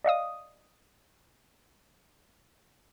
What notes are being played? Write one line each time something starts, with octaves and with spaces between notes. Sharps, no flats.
D5 D#5 F5 D#6